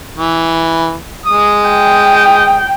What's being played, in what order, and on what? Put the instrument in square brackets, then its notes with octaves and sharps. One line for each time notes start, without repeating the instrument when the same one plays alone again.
[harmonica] E3
G#3 D#6
[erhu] G5